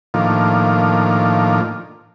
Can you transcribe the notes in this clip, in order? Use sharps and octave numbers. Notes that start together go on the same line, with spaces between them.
A2 D#3 F3 A#3 D4 F4